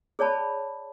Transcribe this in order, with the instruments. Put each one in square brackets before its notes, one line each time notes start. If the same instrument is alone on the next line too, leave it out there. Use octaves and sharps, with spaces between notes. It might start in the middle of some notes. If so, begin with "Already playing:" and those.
[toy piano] G#4 C#5 D5 A5 B5